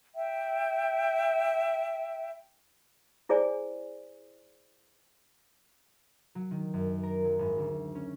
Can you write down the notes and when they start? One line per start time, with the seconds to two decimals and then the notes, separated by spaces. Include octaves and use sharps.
0.15 E5 G5
3.29 E4 G#4 C5 D5 G#5
6.35 F#3
6.51 D#3
6.74 F#2
7.03 A#4
7.25 F#3
7.39 G#1
7.58 D2
7.95 C#4